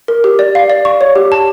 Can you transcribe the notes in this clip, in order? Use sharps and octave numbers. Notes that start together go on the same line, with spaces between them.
A#4
G4
D5
F5
D5
C#6
C#5
G4
A5